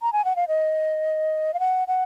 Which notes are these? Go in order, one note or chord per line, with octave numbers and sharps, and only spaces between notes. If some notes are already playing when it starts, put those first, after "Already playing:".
A#5
G#5
F#5
F5
D#5
F5
F#5
F#5